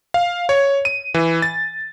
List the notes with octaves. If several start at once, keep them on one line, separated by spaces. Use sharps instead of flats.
F5
C#5
D#7
E3
A6